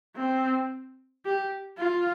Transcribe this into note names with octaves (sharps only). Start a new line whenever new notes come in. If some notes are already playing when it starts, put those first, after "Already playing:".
C4
G4
F4